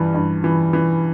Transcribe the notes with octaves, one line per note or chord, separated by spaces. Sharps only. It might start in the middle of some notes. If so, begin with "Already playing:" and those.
Already playing: G2 E3
G2
E3
E3